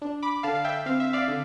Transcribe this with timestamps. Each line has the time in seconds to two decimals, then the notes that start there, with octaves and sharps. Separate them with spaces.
0.02 D4
0.22 B5 D6
0.43 D3 F5 A5
0.55 F5
0.65 E5 G5
0.86 C4 F5
1.00 E5
1.13 D5 F5
1.28 D3